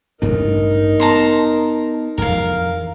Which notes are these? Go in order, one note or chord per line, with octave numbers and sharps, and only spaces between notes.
A1 G2 D4 D#4 A#4
B3 A5 A#5 C6
F2 E3 A#4 F5